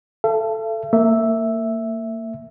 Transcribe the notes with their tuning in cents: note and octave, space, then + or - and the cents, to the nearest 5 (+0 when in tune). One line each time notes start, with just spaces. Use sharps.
A4 +0 E5 +45
A#3 -30 E5 +0